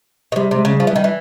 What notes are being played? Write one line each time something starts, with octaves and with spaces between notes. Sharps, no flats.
B2
C3 G3
C3 G#3
C#3
G3
F3
E3
D#3 G3
E3